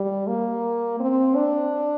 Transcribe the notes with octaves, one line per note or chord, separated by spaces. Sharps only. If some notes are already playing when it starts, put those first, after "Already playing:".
Already playing: G3
A#3
C4
D4